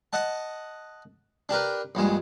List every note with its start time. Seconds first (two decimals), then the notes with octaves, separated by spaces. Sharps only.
0.13 D#5 F#5 A5
1.49 D4 G4 A#4 B4
1.95 A#1 G2 G#3